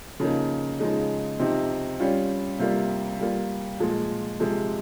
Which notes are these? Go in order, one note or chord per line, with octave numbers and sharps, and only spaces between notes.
C#3 F3 A#3 D#4
C#3 F3 G#3 D#4
C3 F3 C4 D#4
G3 C#4 F4
C3 G3 A#3 F4
G3 A#3 F4
A#2 F3 G#3
C3 F3 G#3